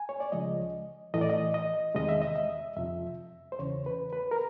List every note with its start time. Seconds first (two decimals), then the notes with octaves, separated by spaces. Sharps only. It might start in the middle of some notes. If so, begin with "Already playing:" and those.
Already playing: G#5
0.09 C#5
0.20 D5
0.32 C#2 C#3 F3 G#3 D#5
1.14 A2 E3 A3 D#5
1.21 D5
1.30 D#5
1.54 D#5
1.95 E2 C3 D#3 G#3 D#5
2.09 E5
2.22 D#5
2.36 E5
2.77 F2 C3 F3 E5
3.52 C5
3.59 E2 C#3 E3 C#5
3.86 B4
4.13 B4
4.31 A#4